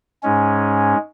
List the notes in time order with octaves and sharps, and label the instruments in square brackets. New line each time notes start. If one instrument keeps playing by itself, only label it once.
[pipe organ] G#2 G#3 C#4